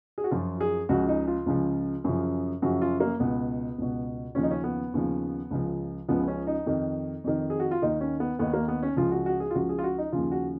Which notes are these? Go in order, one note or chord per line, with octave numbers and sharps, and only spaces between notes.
G#4
F#4
F#2 F3 F4
G#4
C#2 C#3 F3 F#4
D#4
F4
C#2 C#3 F3
F#2 C#3 F3
F#2 C#3 F3 F#4
F4
A#3
C#2 B2 B3
C#2 B2
D#2 C#3 F3 C#4
D#4
C#4
B3
D#2 C#3 F3
C#2 C#3 F3
C#2 C#3 F3 B3
C#4
D#4
F2 D#3
F2 D#3
G#4
F#4
F4
D#2 D#3 D#4
C#4
B3
D#2 D#3 B3
A#3
B3
C#4
C#2 C#3 F3 F4
F#4
F#4
G#4
F4
C#2 C#3 F3 F#4
G#4
F4
F#4
D#4
D#2 C#3 F3 F4
F#4